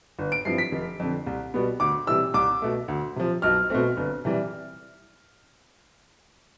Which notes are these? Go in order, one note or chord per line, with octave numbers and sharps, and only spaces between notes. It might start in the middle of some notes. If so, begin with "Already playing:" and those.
G1
D7
G2 F3 C4 E4 C7
B6
F1
F2 D3
C2
B2 G3 B3
D2 D6
C3 E3 G3 E6
C2 D6
B2 A3
D2
C3 F3
B1 F6
B2 A3 C4
G1
C3 E3 G3